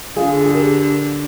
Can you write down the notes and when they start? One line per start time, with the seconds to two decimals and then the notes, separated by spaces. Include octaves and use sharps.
0.16 D3 F4 G#4
0.46 G#4
0.54 G4 A#4